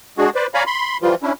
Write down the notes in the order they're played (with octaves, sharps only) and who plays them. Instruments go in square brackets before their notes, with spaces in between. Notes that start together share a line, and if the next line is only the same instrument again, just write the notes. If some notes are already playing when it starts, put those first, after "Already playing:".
[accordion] G#3 D4 F#4 G#4
B4 C5 D5
C#5 D5 F5 G#5 A#5 B5
B5 C6
E3 F3 G3 F4
C#4 D4 E4